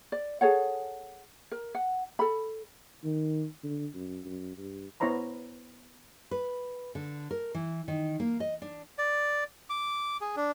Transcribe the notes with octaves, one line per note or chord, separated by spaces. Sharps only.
D5
G#4 A4 C#5 F#5
A#4
F#5
A4 B5
D#3
D3
F#2
F#2
G2
B3 E4 C5 C#5 A#5 B5
B4
D3
A#4
E3
D#3
A#3
D#5
D4
D5
D6
G#4
D4